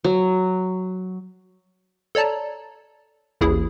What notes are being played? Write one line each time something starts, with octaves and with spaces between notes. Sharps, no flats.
F#3
A4 C#5 D5 A5 A#5
A1 D#2 E4 G#4 D#6